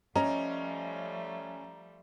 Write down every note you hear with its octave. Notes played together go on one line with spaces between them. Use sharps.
F3 G3 A3 C#4 D#5 A#5